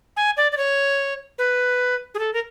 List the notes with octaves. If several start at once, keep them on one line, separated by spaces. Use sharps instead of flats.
G#5
D5
D5
C#5
B4
G#4
A4
A#4